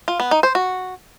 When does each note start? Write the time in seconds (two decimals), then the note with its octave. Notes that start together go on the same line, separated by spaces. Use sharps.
0.08 F4
0.20 B3
0.31 D#4
0.43 C5
0.55 F#4